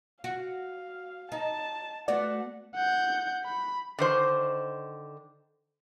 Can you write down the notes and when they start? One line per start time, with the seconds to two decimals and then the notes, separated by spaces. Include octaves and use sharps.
0.24 F#4 F5
1.32 D#4 A5
2.08 A3 B3 F#4 D5 F#5
2.75 F#5 G6
3.44 B5
3.99 D3 D#3 C5